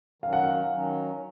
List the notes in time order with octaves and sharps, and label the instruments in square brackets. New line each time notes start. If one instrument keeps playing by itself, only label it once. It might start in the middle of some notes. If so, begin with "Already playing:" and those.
[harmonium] D#3 F#3 C#4 [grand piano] F5
[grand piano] F#5
F5
[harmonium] D#3 F#3 C#4